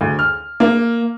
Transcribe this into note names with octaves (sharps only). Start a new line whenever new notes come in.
D2
F6
A#3